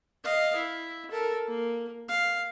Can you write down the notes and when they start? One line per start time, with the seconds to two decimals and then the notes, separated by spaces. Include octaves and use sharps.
0.24 D#5 F5
0.56 E4
1.11 A4 A#4
1.48 A#3
2.08 F5